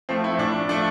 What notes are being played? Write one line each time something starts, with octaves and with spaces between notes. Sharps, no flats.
F3 A3 C4
E4
A2 D4
F3 A3 D4